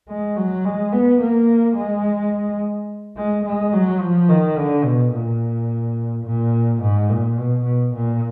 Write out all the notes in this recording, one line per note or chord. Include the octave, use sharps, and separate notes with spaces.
G#3
F#3
G#3
B3
A#3
G#3
G#3
G#3
F#3
F3
D#3
D3
B2
A#2
A#2
G#2
A#2
B2
B2
A#2